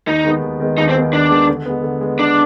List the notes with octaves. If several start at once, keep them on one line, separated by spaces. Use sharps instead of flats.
D#2 D#4
D#3 G#3 B3
D#2
D#3 G#3 B3
D#2 D#4
C4
D#3 G#3 B3
D#2 D4
D#3 G#3 B3
D3
G#3 B3
D3
G#3 B3
D3 D4